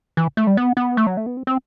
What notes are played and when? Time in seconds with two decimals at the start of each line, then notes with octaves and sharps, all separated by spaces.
0.17 E3
0.37 A3
0.47 G3
0.57 B3
0.77 B3
0.97 A3
1.07 F#3
1.17 A3
1.26 B3
1.37 C4
1.47 C4